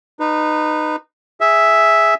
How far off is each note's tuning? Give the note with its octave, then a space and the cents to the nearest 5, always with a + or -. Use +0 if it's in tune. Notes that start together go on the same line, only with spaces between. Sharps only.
D#4 -20 B4 +0
G#4 +0 E5 +0